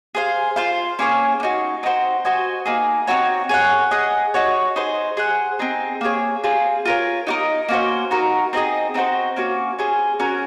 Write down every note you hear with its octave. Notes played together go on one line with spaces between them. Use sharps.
G#4 C5 F5
F4 C5 F5
A#3 C#4 G#4 C#5
A#3
D#4 F#4
C4 D#4 F#4 C5
F#4 C5 D#5 G#5
A#3 D#4 G#4
C4 D#4 F#4 C#5
G#4 C#5 F#5
G#4 D#5 F#5
D#4 F#4 C#5
D#4 G#4 C5
G#4 C5 F#5
C4 D#4 G#4
A#3 D#4 G#4 C#5
C4 F4 G#4
F4 A#4 C#5
D#4 F#4 A#4 D#5
A#3 C#4 F#4 C5
D#4 F#4 A#4
C4 D#4 G#4 D#5
C4 D#4 F#4 C5
A#3 C#4 F#4
C#4 G#4 C5
C#4 F#4 A#4